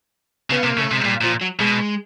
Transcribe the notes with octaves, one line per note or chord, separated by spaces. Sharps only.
C#3 B3
C3 A#3
C#3 A3
C3 G#3
A#2 G3
A#2 F3
F#3
B2 G#3